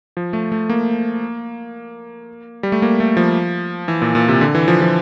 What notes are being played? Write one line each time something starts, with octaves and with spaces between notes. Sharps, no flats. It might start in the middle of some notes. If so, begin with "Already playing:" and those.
F3
A3
A3
A#3
G3
A3
A#3
A3
F3
E3
A#2
A#2
C3
D3
E3
F3
F3